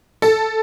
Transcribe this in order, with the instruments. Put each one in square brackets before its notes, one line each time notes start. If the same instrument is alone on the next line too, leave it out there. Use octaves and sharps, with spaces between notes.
[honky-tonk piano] A4